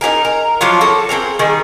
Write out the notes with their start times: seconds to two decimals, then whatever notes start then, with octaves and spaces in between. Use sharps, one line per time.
0.01 D#4 G4 G#4 A#4
0.25 A#4
0.61 F3 F#3 D4 F4
0.81 F#4 A4
1.09 C4 C#4 G#4 A#4
1.39 D#3 G3 G#4